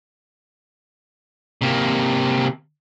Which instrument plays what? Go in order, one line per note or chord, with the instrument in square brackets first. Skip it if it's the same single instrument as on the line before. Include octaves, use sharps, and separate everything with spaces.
[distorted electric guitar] C3 A#3